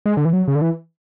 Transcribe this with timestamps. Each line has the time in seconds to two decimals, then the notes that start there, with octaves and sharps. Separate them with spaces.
0.06 G#3
0.17 D3
0.25 E3
0.33 F#3
0.48 C#3
0.55 D3
0.62 E3